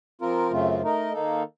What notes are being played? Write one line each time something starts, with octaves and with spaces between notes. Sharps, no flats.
F3 C4 F4 A#4
F#2 C#3 A3 C4 F4
A3 D#4 A#4 D#5
D#3 A#3 D#4 A4